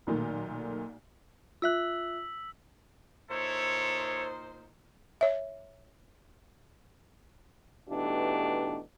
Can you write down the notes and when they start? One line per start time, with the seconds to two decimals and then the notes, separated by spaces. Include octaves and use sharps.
0.07 B1 A#2 D#3 A3
1.62 F4 E5 E6 F#6 B6 F#7
3.30 A#2 D#4 E4 A4 C5 C#5
5.21 C#5 E5
7.89 B2 E3 A3 D4 D#4 G4